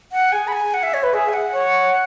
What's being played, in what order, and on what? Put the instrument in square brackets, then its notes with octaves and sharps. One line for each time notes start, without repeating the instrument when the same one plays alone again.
[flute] F#5
[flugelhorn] G#4 [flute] G#5
[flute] B5
G#5
F#5
E5
C#5
B4
[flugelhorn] G#4 [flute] E5
[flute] G#5
F#5
[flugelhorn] C#5